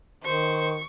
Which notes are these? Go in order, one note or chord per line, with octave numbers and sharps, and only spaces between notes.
D#3 C5 C#6